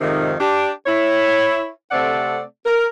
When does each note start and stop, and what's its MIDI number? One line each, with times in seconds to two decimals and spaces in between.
0.01 0.33 41
0.01 0.33 44
0.01 0.33 48
0.01 0.33 51
0.40 0.70 62
0.40 0.70 67
0.86 1.69 64
0.86 1.69 73
1.91 2.42 48
1.91 2.42 57
1.91 2.42 60
1.91 2.42 69
1.91 2.42 74
1.91 2.42 78
2.66 2.86 70